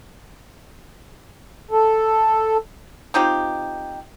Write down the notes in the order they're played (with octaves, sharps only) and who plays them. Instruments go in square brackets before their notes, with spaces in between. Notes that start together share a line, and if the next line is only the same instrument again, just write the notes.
[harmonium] A4
[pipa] C4 D#4 F4 G4